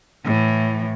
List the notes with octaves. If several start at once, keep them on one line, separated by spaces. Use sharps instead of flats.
A2 E3